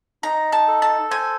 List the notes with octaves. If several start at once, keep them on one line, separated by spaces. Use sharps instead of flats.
D#4 A#5
A5
A4
A5
C5 G#5